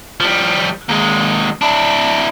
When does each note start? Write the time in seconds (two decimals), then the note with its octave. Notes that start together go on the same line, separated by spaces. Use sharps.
0.20 F3 G3
0.89 D#2 G#3
1.61 D4 E4